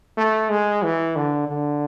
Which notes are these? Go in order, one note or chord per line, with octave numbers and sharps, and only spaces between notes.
A3
G#3
E3
D3
D3